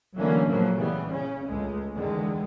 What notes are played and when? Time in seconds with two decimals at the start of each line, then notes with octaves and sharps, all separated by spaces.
0.16 D3 E3 F#3 A3 A#3 C#4
0.47 A#2 C#3 F3 F#3 A3 A#3
0.76 C#3 E3 G3 B3
1.10 C#3 C#4
1.46 C#2 G#3 A3
1.95 E2 D3 D#3 G#3